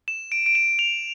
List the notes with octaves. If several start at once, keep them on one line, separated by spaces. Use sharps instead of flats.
E7
D7
D7
E7
F7